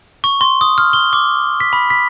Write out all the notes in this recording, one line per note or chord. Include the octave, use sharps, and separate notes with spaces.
C#6
C6
D#6
F6
G7
D6
B6
B5
B6